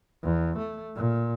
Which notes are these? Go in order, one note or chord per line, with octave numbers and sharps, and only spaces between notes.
E2
A3
A#2